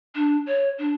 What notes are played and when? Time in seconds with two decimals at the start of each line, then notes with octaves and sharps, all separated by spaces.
0.15 D4
0.46 C#5
0.79 D4